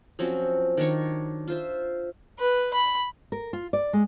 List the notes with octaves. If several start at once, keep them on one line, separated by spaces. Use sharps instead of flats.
F3 F#3 C4 C#4
D#3 D4 C#5
F4 C5 E5
B4
B5
A#4
F4
D5
G#3